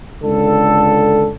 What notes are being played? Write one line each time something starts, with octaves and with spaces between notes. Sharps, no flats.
C#2 D3 A4